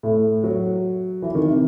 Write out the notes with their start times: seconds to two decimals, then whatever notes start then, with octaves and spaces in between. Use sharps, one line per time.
0.03 A2
0.44 F#3
1.22 E3
1.35 D#3
1.48 C3